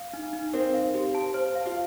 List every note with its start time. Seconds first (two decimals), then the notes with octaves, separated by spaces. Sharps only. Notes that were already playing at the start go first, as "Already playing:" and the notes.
Already playing: F5
0.13 D#4
0.33 D#4
0.53 C4 A#4
0.74 F5
0.94 G4
1.15 A5
1.34 C5
1.55 F5
1.66 F4